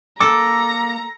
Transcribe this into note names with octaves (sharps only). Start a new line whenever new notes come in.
A#3 A4 A#5 D6